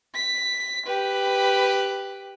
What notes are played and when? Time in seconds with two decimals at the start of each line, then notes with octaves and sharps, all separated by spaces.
0.15 B6
0.86 G4 B4